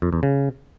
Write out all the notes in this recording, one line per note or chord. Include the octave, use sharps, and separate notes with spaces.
F2
E2
C#3